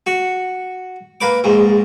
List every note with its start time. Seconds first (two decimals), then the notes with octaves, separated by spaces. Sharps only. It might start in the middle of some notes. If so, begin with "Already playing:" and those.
0.07 F#4
1.21 A#3 B4 D6
1.44 A#1 G#2